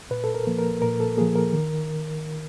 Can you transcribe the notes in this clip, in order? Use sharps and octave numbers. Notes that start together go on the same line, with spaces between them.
A#2 B4
A4
A#4
F3 A#3
A#4
A#2 A#4
A4
F3 A#3 G#4
A#4
D#3